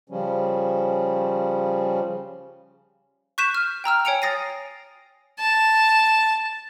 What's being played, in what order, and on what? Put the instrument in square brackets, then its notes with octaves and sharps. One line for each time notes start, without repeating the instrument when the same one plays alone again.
[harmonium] C#3 F3 G3 C#4
[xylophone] C#6 F#6 G6 B6 D#7 E7
F6
G5 A#5 E6 F6
C#5 G5 G#5 C#7 D7 F7
D#6 A6 A#6 C7 D#7
[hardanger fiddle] A5